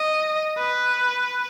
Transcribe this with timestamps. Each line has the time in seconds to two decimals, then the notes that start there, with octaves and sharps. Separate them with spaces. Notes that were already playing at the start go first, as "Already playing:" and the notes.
Already playing: D#5
0.58 B4